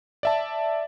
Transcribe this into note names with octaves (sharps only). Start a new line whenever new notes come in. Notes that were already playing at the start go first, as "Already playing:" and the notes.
D5 E5 A5